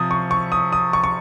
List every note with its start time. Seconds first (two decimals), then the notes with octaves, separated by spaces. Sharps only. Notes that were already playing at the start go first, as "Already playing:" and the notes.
Already playing: C3 F3 D#6
0.11 C#6
0.31 C#6
0.52 D#6
0.72 D#6
0.93 C#6
1.04 C#6